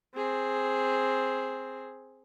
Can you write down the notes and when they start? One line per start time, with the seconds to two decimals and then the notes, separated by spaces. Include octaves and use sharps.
0.15 C4 G#4